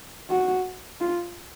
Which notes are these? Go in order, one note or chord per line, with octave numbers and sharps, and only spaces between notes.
F#4
F4